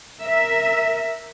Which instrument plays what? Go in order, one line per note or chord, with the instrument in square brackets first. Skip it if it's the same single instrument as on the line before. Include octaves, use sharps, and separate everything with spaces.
[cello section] A#4 E5